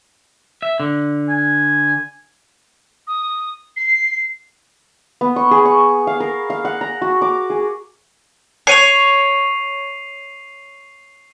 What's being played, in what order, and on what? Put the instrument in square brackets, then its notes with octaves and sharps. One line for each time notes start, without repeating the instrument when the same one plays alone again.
[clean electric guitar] E5
D3
[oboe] G#5
[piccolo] D#6
C7
[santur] B3
C#6
G#4
C#6
F5
A#4
F5
F#5
A#5
F#4
D6
G#4
[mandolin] C#5 [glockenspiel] C7 D#7 F7